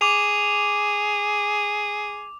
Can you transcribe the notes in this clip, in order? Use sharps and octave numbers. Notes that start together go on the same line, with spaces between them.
G#4 D6 F7